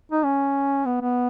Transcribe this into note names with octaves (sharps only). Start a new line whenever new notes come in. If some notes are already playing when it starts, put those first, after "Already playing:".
D#4
C#4
B3
B3